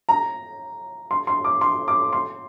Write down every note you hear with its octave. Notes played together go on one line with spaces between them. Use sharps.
A#5
C6
C6
D6
C6
D6
C6